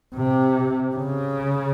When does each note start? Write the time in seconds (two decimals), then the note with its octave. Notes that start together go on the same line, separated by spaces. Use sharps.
0.15 C3
0.95 C#3